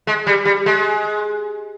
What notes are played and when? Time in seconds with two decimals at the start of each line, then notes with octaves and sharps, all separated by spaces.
0.07 G#3
0.27 G3
0.45 G3
0.66 G#3